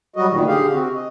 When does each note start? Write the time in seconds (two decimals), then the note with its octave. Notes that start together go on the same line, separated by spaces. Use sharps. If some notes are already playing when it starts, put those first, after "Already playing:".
0.16 F#3 G3 F#4 D#5
0.30 D2 A#2 D#3
0.47 D3 G4 G#4 F5
0.73 C3 C4 F#4
0.95 D#5